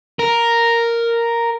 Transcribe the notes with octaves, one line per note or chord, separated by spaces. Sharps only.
A#4